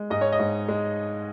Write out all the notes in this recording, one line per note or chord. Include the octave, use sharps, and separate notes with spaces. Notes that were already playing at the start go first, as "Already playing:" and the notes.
Already playing: G#3
G#2 D#5
C#5
D#5
G#2
G#3